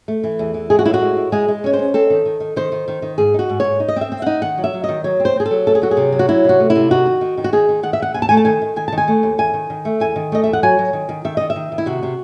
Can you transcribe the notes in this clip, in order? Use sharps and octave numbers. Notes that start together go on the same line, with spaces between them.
A3
E3
E2
E3
G#3 G#4
F#4
A2 E4
F#4
G#3
E4
G#3 G#4
G#3
C#4 C#5
C5
C#4
C4 A4
D#3
D#3
D#3
D#3 C5
D#3
D#3
D#3
G#2 G#4
D#4 F#4
G#2
G#2 C#5
D#4
D#5
C4 E5
C4
D#4 F#5
D#3 F#5
F#3
E5
F#3
D#5
D#3
F#3 C#5
C4
C5
C4 G#4
A4
F#3
A3 A4
G#4
F#3 F#4
G#4
C3
F#3
F#4
F#3 E4
C3 F#4
A3
E4
C3
D#4 F#4
D#3
D#3
D#3
F#4
D#3 G#4
D#3
D#3 F#5
E5
D#3 F#5
D#2 G#5
A5
A3 G#5
A5
D#3 G#5
D#3
D#3 G#5
A5
D#3
G#5
A3
D#2
E2 G#5
D#3
D#3
A3
E2 G#5
D#3
A3 D#5
E2 E5
F#5
F#3 G#5
F#3
D#3
D#3
D#3 E5
D#3 D#5
E5
D#3
D#3
E4
C3 F#4
C3